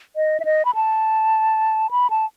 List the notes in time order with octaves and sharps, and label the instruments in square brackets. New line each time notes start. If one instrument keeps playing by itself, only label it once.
[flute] D#5
E5
D#5
B5
A5
B5
A5